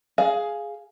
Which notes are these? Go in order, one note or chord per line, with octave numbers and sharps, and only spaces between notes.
G#4 F5